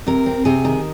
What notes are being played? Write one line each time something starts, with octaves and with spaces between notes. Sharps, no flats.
C3 A#4
C4
C3 G#4
D#3